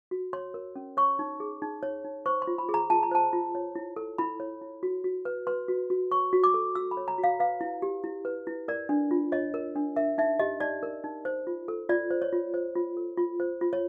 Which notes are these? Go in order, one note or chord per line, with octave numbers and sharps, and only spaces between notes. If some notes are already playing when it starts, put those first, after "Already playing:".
F#4
C#5 C6
A#4
C#4
C#5 C#6
D#4
G#4
D#4
C#5
D#4
C5 C#6
C6
F4
B5
G#4
A#5
F4 A5
A#5
C5 A5
F4
C#5
E4
A4
E4 B5
C#5
E4
F#4
F#4
B4
B4 C6
F#4
F#4
C#5 C#6
F#4
D6
A4
F#4 E6
B5
C#5
A#5
F#4
F5
B4 F5
E4
G4
E4
B4
E4
A#4 D5
D4
F4
C#5 D#5
A#4
D4
A#4 E5
D#4 E5
G4 D#5
D#4 D5
A#4
D#4
C5
F4
A4
F4 D5
C5
C#5
F4
C5
F4
A4
F4
C5
F4
C#5